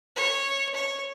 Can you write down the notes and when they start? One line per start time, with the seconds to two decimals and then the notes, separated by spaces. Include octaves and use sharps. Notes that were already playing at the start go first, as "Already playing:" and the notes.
0.16 C#5
0.74 C#5